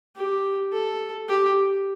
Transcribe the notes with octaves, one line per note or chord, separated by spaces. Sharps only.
G4
A4
G4